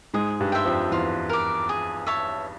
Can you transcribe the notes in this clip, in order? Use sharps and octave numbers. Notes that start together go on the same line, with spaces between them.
G#2 G#3 G#4
G2 G3
C5 E5 G5
F2 F3
E2 E3 F4
A#4 D5
G#4
C#5 E5 A5